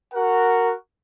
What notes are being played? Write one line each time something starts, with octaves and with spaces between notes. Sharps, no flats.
F#4 A#4 F#5